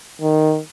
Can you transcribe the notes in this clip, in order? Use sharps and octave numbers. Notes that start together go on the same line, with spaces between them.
D#3